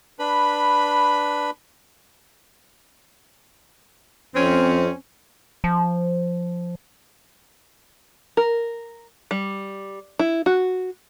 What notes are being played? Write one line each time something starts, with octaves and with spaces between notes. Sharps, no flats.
D4 B4 B5
F2 C4 C#4
F3
A#4
G3
E4
F#4